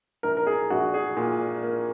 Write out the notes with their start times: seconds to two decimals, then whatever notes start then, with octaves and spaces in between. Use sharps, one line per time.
0.23 A#1 A#4
0.37 A#4
0.47 G#4
0.70 A#1 F#4
0.94 G#4
1.17 A#2
1.63 A#3